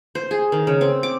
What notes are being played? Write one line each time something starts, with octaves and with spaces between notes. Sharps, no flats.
C5
G#4
D#3
C#3
C4
D6